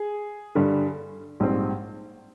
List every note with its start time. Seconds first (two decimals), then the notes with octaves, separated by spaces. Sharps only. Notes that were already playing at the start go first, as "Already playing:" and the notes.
Already playing: G#4
0.55 G2 D3 G3
1.40 A#1 G#2 G3 C4